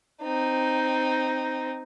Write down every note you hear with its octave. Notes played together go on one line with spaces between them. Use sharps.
C4 D#4